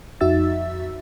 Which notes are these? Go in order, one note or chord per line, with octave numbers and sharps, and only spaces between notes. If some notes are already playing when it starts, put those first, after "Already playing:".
F2 D#4 F#4 E5 E6 A6